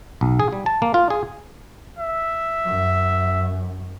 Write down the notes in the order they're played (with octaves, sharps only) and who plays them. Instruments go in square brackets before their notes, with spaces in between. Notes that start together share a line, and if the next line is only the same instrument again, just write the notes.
[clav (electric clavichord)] B1
G#4
G3
A5
A#3
F4
G#4
[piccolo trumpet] E5
[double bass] F#2